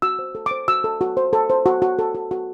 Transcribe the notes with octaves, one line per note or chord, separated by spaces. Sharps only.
F#4 E6
C5
A4
C5 D6
F#4 E6
A4
F#4
C5
A4
C5
F#4
F#4
A4
F#4
F#4